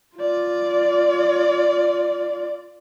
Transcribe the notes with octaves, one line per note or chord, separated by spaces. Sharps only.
F4 D5